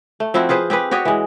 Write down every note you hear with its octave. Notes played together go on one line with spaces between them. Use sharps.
A3
F3 C4 E4 F#4
F4 G#4 B4 C5
C4 G4 G#4 B4
F#4 G4 C#5 D#5
E3 G#3